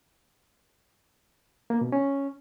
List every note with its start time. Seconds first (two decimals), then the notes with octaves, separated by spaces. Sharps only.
1.70 A#3
1.81 B2
1.92 C#4